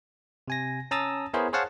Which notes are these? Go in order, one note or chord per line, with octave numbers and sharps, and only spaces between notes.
C3 G#5 A#6
C#4 A5 A#5 D#6 E6 A6
B3 E4 G#4 A#4 C5 C#5
G#4 C5 C#5 F5 F#5 A5